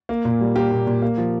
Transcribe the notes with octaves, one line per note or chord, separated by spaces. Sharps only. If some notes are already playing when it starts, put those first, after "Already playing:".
A#3
A#2
G3
A#3 G4
A#2
A#2
A#3
F3